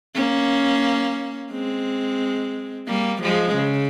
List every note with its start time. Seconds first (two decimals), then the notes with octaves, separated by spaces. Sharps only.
0.15 A#3 C#4
1.51 G#3 C4
2.87 G3 A#3
3.22 F3 G#3
3.55 C#3